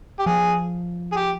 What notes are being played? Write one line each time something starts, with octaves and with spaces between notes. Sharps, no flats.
G4
F3 G#4
G#4
G4